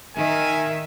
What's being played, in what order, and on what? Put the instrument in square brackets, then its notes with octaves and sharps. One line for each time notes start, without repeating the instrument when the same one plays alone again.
[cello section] D#3 E5 [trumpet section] A#4 G#5